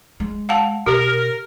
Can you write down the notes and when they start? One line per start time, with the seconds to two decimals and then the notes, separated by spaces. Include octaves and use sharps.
0.20 G#3
0.49 F5 F#5 A5
0.86 B2 G4 A#4